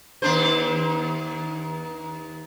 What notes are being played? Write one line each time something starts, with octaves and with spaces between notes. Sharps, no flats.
D#2 D4 C5